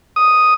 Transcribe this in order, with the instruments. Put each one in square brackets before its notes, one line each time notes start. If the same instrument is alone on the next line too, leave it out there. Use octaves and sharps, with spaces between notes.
[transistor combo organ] D#6